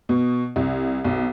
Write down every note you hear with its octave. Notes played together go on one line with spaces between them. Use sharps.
B2
C2
B1